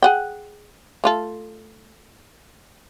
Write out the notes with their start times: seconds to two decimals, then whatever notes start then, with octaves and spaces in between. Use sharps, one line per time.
0.03 G#4 F#5 G5
1.04 A3 F4 A4